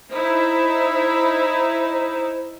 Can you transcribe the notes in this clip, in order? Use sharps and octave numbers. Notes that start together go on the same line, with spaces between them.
D#4 E4 C5 E5